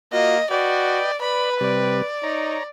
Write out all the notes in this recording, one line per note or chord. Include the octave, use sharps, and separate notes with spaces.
A#3 F4 F#4 D#5
F#4 B4 D5 D#5 G5
B4 D5 B5
C3 G3 D5
D#4 C#5 A#5